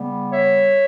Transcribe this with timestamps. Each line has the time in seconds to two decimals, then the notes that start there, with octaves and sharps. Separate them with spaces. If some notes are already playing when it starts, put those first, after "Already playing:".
Already playing: C#3 G3 B3
0.32 C#5 E5